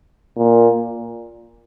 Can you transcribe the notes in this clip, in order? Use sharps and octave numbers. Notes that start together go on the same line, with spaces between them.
A#2